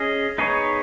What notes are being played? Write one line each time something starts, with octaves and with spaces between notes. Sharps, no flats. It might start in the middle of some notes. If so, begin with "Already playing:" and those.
Already playing: C#4 G#4 D#5
B3 D#4 G#4 C#5